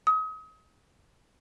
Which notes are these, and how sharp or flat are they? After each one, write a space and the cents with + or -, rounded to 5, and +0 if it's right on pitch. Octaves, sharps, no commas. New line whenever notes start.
D#6 +35